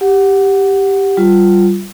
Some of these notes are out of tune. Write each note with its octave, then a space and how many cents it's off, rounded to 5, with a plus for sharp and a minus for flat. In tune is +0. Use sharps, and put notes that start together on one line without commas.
G4 +0 F#5 +0
G3 -15 F4 +0